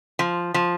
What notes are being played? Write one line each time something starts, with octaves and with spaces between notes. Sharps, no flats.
F3
F3